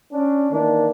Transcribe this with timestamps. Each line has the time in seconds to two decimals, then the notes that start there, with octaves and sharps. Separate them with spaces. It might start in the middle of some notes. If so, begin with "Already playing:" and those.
0.12 C#4 D4
0.51 D#3 E3 A#3 D4